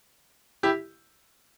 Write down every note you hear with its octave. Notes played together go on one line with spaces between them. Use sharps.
E4 G4